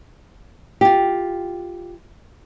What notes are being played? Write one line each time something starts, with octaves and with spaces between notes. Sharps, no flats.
F4 G4